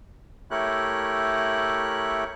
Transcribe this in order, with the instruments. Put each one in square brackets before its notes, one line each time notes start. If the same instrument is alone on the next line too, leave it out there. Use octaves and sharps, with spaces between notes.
[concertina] A3 E4 G4 A#4 C#5 F#6